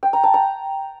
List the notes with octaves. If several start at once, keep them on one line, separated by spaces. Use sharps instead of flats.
G5
A#5
A5
A#5